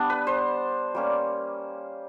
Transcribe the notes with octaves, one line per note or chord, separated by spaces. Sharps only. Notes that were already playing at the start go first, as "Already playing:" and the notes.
Already playing: G3 B3 D4
B4
C5
G3 A#3 C#4